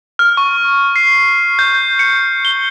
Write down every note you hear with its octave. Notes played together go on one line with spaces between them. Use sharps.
F6
C#6
C7
G6
C#7
G7